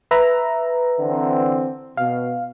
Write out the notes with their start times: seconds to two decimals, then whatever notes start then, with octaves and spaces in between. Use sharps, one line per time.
0.11 B4 E5 A#5
0.99 D3 E3 C4
1.97 B2 F5